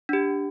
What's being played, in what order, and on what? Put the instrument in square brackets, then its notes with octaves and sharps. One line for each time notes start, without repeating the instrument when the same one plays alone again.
[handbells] D4 G4